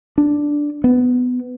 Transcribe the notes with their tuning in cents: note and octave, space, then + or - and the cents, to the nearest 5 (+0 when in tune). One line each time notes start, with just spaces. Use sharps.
D4 +0
B3 +15